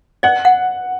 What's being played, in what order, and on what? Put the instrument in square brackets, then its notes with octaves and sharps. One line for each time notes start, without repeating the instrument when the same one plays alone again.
[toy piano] D5 [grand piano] F#5
[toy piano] F#5